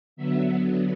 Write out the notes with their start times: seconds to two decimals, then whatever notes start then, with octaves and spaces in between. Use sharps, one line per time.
0.16 D3 F#3 B3 E5